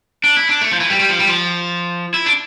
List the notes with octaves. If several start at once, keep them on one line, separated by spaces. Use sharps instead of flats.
D4
E4
D4
A3
F3
E3
G3
G3
F3
G3
F3
E4
D4